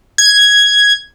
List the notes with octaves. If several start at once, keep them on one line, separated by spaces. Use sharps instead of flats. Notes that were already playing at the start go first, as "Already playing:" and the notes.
G#6